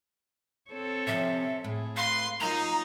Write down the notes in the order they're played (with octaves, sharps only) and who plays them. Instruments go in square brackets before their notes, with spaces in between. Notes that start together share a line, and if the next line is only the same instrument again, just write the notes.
[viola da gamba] C4 A4 C#5
[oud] C3 F3 C#4 [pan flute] E5
[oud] A2 [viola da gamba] G#4
[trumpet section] B4 C6 [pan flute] F5
[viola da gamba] F#3 F4 [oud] A#3 [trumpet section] D#4 [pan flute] A#5